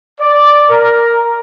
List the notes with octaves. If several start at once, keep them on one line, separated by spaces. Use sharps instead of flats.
D5
A#4